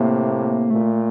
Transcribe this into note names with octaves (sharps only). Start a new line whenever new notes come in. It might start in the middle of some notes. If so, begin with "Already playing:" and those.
Already playing: A2 C3 A#3
A#2 A3